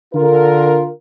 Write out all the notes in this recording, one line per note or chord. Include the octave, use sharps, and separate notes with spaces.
D3 F4 A#4